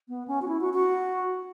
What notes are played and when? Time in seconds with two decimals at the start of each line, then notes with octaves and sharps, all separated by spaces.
0.09 B3
0.28 C#4
0.42 F#4
0.48 E4
0.61 F#4
0.73 F#4